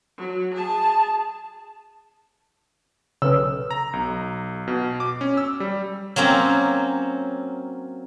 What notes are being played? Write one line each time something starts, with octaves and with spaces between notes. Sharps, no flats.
F#3
G#4 A5
B1 C#3 A4 B4 C#5 E6
A#5
B1
B2
D6
C#4
E6
G3
F#3 A#3 C4 C#4